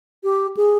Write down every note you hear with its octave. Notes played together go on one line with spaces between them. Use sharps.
G4
G#4